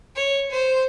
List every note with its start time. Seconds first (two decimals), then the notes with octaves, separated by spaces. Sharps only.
0.15 C#5
0.51 C5